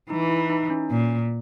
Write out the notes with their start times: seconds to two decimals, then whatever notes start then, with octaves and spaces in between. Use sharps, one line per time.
0.10 E3 D#4
0.30 E4
0.50 D#4
0.70 C#4
0.90 A#2